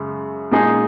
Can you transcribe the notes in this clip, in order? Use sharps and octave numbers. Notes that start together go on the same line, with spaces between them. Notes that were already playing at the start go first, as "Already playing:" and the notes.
Already playing: F#2 C#3 G#3
A#2 G#3 D#4 G#4